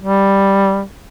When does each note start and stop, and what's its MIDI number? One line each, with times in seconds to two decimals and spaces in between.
0.02 0.82 55